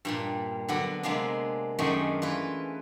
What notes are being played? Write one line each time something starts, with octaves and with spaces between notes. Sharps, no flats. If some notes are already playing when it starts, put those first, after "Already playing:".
G2 A#2 G3
D3 F#3 B3 D4
C3 G#3 A#3 B3 D4
F#2 D#3 G#3 A3 C#4 D4
E3 F4 B4